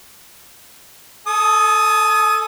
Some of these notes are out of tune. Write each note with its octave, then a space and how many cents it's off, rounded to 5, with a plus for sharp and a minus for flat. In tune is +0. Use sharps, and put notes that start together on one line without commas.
A4 +0 G#5 +45 D#6 +5